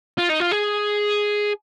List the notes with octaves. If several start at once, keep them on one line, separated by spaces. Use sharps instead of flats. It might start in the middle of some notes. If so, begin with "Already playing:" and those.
F4
D#4
F4
G#4